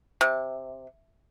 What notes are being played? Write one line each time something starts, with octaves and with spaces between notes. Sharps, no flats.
C3